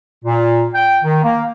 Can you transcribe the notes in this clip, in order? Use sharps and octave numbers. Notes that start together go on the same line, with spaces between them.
A#2
G5
D#3
A#3